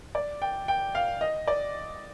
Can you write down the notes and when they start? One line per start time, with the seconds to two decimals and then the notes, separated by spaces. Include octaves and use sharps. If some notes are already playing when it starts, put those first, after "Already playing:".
0.15 D5
0.42 G5
0.68 G5
0.95 F5
1.21 D#5
1.48 D5